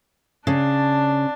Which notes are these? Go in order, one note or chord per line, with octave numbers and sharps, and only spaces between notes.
C#3 D4 A5